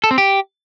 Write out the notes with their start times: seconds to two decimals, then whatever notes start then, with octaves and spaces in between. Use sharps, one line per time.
0.04 A4
0.11 C4
0.18 G4